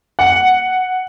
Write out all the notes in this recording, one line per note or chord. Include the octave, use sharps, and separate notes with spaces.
F#5